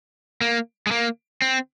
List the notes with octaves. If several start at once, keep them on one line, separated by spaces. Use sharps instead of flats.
A#3
G#3
A#3
C4